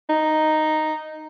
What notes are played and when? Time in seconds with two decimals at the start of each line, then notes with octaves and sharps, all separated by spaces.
0.09 D#4